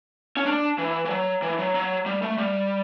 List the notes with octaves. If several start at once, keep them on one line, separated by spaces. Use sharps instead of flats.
C#4
D4
E3
E3
F#3
E3
F#3
F#3
G3
A3
G3